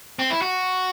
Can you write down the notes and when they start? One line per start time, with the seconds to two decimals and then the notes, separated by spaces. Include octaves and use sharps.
0.19 C4
0.30 E4
0.42 F#4